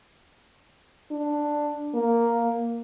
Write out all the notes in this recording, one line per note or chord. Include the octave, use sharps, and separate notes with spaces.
D4
A#3